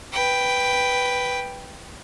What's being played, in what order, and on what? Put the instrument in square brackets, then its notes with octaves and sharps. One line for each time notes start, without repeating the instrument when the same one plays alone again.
[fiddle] B4 G5